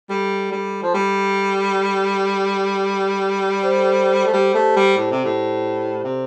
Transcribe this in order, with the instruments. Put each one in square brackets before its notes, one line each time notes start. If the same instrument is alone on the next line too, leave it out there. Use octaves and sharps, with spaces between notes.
[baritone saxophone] G3 [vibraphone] A4
[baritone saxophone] G3
F3
G3
[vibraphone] D5
C5
A4
C5
[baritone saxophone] A3
[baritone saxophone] G3 [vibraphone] G4
[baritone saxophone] A3
G3
A2
C3
A2
C3